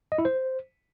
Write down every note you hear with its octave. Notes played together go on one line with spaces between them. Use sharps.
D#5
E4
C5